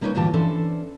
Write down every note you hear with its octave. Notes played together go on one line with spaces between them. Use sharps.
G3 A#3 C#4 D#4 B4 C#5
D2 G2 A#2 E3 G4 A5
E3 C#4 D4 A4 C5